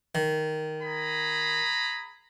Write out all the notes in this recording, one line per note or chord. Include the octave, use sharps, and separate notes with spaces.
D#3
G#4 A#5 B5